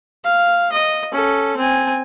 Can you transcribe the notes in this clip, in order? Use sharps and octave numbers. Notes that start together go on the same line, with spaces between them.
F5
D#5
C#4 A4
C4 G#5